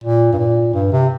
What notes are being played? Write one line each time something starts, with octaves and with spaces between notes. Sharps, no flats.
A#2
G2
A#2
G2
C3